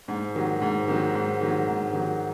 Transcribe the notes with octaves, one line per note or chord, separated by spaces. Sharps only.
G#2
D#3 F#3
G#2
D#3 F#3
G#2
D#3 F#3
G#2
D#3 F#3